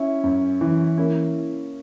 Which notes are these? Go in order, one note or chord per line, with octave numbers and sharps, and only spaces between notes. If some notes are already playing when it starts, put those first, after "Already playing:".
Already playing: C#4 E4
F#2
E3
A#3 C#4 E4